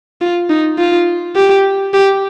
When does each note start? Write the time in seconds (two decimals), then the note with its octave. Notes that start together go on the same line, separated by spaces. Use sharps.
0.21 F4
0.50 D#4
0.78 F4
1.36 G4
1.94 G4